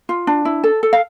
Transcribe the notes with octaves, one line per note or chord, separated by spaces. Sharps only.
F4
D4
E4
A4
A4
F5